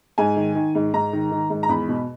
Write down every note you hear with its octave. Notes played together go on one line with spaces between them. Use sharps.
G#2 G#5
D#3
D#3
G#2
G#2 A#5
D#3
D#3
G#2
A#5
E2 B5
B2